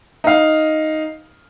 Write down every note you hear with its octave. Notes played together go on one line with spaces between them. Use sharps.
D#4 F5